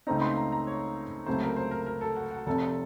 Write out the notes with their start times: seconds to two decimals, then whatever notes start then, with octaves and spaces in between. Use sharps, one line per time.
0.07 C#2 C#3 A3 C4 D#4 A#5
0.22 C6
0.37 A#5
0.52 A#5
0.67 C#5
1.26 C#2 C3 F#3 A3 C5
1.42 A#4
1.56 C5
1.71 A#4
1.86 A#4
2.01 A4
2.16 F#4
2.31 F#4
2.46 F1 F2 C3 A4